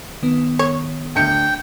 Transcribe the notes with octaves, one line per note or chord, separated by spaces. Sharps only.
D#3 B3
C#5
D2 G5 G6 C#7